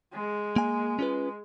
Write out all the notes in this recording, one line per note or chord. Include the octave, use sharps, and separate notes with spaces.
G#3
A#3 G#5
C#4 F4 B4